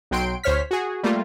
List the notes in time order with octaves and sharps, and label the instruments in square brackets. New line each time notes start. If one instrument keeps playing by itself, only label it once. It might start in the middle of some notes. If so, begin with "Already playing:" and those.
[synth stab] B1 F#3 G5 C6 D7
D2 C5 C#5 F6 B6
F#4 G#4
G3 A3 A#3 F4